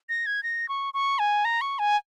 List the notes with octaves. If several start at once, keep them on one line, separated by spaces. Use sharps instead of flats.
A#6
G#6
A#6
C#6
C#6
G#5
A#5
C#6
G#5